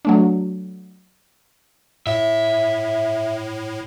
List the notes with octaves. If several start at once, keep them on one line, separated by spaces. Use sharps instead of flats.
F#3 A3 D4
A2 E5